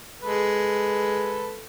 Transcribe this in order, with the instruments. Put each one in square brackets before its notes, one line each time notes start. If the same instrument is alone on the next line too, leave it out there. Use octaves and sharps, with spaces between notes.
[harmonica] G#3 A4 B4